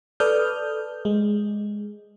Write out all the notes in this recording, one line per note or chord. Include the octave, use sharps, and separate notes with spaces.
A4 B4 D5 D#6 F6 G6
G#3